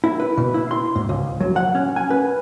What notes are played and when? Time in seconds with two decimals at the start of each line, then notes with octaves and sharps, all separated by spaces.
0.04 E4
0.20 B4
0.37 B2
0.54 E4
0.71 C6
0.96 G#2
1.09 C#2
1.40 F#3
1.56 F#5
1.75 C#4
1.96 G#5
2.10 B4